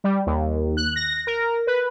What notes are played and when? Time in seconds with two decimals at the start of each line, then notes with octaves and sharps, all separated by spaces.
0.04 G3
0.27 D#2
0.77 F#6
0.96 A#6
1.27 A#4
1.67 B4